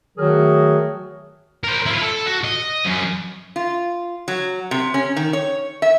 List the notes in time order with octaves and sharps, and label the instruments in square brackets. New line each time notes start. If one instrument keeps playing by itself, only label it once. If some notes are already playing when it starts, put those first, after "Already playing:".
[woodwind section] D#3 F#3 A3 F#4 G#4 A#4
[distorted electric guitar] A#4 C5
E4 F4
A4
F#4
D#5
F#2
[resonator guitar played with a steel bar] F4
F#3
C3
C#4
D#3
C#5
E5